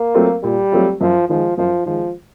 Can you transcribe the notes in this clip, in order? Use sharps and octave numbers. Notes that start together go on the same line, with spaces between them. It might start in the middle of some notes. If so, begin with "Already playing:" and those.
Already playing: A#3
F#3 A3 C4 F4
A#2 G3
F#3 A3 C4 F4
F#2 F3
D#3 F3 G#3
F#2 F3
D#3 F3 G#3